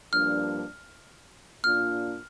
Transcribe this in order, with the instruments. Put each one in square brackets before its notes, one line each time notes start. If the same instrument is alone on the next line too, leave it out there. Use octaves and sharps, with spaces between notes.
[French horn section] G2 F3 A#3 D4 [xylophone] F6
[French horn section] A#2 A#3 D4 F4 [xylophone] F6